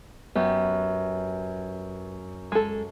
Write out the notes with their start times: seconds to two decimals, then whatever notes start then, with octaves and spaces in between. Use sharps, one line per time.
0.35 F#2 B3 G4
2.52 G#3 A4